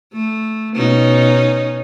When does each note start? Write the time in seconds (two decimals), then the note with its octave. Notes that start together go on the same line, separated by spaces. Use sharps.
0.13 A3
0.75 B2 C#4 D#4